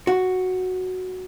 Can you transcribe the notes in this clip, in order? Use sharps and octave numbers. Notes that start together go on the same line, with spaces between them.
F#4 F#5